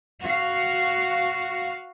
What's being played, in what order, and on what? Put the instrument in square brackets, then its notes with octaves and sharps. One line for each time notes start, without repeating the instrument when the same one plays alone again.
[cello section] F#4 F5